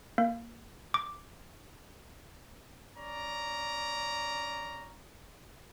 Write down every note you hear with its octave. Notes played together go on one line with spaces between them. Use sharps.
A#3
D6
C#4 D5 A#5